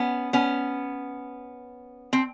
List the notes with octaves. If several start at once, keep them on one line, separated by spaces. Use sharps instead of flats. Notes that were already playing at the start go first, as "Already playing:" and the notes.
Already playing: B3 C#4
B3 C#4
C4